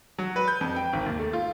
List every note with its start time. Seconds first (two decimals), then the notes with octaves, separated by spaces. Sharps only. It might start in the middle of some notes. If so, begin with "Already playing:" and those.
0.18 F#3
0.36 B4
0.48 G6
0.61 F2
0.76 G5
0.93 G#1
1.06 D#2
1.19 A3
1.33 F4